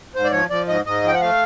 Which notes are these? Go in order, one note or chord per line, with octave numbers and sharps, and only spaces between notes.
G#2 C5
D5
F3 C#5
F3 D5
G#2 D#5
G#2 D#5
F3 G5
F#5
A3 F5